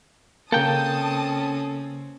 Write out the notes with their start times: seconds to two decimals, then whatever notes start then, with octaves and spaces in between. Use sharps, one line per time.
0.52 C#3 A#3 C4 C#4 A4 G5 A5 D#6